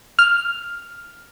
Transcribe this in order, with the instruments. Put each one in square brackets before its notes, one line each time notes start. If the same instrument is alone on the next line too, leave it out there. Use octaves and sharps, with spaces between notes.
[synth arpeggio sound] F6